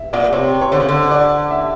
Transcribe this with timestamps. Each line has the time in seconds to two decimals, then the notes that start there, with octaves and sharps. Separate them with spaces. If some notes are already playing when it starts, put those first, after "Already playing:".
Already playing: E5
0.13 A#2 D5
0.33 C3 C#5
0.61 C#5
0.72 D3 C5
0.80 C#3
0.89 D3
1.11 D5
1.51 E5